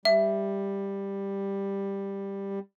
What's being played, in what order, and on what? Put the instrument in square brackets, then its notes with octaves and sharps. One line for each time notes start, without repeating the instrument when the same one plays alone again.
[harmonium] G3 [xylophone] E5